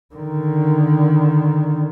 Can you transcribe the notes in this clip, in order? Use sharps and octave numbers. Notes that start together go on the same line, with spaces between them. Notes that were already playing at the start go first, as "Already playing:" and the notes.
D3 D#3